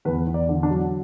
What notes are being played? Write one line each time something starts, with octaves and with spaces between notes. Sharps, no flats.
E2 B4
E2
D5
D3
D4
F#3